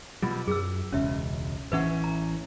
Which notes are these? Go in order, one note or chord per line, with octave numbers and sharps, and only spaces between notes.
B2 F#3 G3 F4
F#2 G#4 E6
E1 C#2 C#4 E5
A1 E3 C#4 B4 E5 F#5
A#5